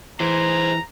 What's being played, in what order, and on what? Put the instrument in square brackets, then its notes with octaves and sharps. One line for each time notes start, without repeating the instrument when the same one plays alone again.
[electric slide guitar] E3 [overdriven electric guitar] G#4 C5 [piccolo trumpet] A#5